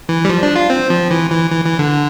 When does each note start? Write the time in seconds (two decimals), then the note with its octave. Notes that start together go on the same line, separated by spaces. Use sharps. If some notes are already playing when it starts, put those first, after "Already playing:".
0.09 E3
0.25 G3
0.29 F3
0.43 D4
0.56 F4
0.70 C4
0.90 F3
1.11 E3
1.30 E3
1.51 E3
1.65 E3
1.79 D3